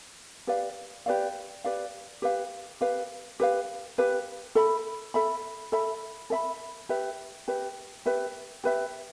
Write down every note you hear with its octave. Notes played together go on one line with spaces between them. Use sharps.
G4 B4 D5 F5
G4 B4 D5 F5
G4 B4 D5 F5
G4 B4 F5
G4 B4 F5
G4 B4 F5
G4 B4 F5
A4 E5 B5
A4 E5 B5
A4 E5 B5
A4 E5 B5
G4 B4 E5
G4 B4 E5
G4 B4 E5
G4 B4 E5